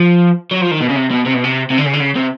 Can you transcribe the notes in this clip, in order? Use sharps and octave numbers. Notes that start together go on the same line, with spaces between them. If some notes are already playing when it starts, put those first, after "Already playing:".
Already playing: F3
F#3
F3
D#3
B2
C#3
C3
B2
C3
B2
C3
C3
D3
C#3
D3
C#3
C3